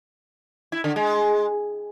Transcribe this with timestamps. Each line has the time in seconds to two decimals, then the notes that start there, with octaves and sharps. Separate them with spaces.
0.72 E4
0.84 D3
0.96 G#3